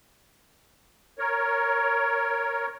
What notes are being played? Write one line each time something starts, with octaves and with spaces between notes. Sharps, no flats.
A#4 C#5